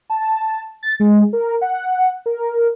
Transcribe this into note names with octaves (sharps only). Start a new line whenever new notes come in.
A5
A6
G#3
A#4
F#5
A#4